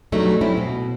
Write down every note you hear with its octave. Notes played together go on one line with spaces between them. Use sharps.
B2 F#3 G3 A3 D4 D#4
A3 C4 C#4 E4
B2